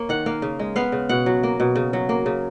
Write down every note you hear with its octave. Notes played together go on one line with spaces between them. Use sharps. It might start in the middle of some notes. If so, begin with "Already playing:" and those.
Already playing: A#3 C#5
D#3 F#5
A#3 F5
C#3
G#3
B3 F5
C#3
B2 F#5
F#3
A#3
B2
C#3
F#3
A#3
C#3